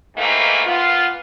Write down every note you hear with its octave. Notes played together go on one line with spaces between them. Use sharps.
G#2 D#3 E3 A3 A#3
A#2 B3 F4